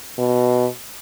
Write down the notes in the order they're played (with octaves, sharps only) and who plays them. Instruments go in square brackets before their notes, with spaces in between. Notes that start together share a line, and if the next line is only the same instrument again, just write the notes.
[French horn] B2